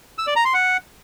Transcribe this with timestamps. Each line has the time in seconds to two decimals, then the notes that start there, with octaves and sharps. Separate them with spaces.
0.18 E6
0.27 D5
0.36 A#5
0.45 C6
0.54 F#5